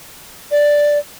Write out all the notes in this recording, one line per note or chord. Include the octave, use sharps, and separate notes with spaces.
D5